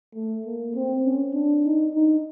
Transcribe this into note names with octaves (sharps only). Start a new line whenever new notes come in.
A3
A#3
C4
C#4
D4
D#4
D#4